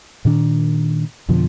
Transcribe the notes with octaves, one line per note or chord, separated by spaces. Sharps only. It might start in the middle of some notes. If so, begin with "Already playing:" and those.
A#2 D#3 D4
F2 B2 D3 F3